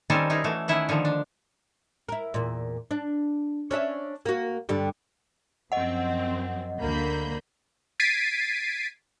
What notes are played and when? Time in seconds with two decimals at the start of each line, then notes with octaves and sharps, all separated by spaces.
0.10 D#3 G3 C4 C#4 A4 A#4
0.30 C#4 D#4 E4 G#4
0.44 E3 A3 F#4
0.68 D#3 C#4 E4 E5 F#5
0.89 D3 D#3 F3
1.05 D4
2.09 E4 A#4
2.34 E2 A#2
2.91 D4
3.71 C#4 D4 E5
4.26 A#3 F#4
4.69 G2 D3 G3
5.72 F#2 F3 C4 D#5 F#5
6.79 D2 D3 A#3 B5 G6
8.00 G#6 A6 B6 C7 D7 D#7